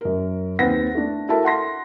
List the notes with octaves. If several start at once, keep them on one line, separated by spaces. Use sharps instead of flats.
F#2 A#4
D#2 C4 B4 F#5 A6 A#6
A3 D4
E4 F#4 A4 A#4 E5 A5
F#5 C6 A#6